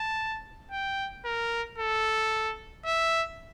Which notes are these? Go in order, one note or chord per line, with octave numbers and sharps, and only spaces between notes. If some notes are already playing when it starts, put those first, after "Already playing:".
Already playing: A5
G5
A#4
A4
E5